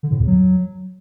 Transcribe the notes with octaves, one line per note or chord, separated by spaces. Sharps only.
D3
A2
E2
F#3